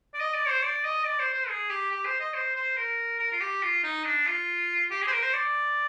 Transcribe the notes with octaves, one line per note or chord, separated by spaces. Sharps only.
D5
D#5
D5
C5
D5
D#5
D5
C5
C5
G#4
G4
G4
C5
D#5
C5
C5
A#4
A#4
F4
G4
F4
D#4
D4
F4
G4
G#4
C5
A#4
C5
D5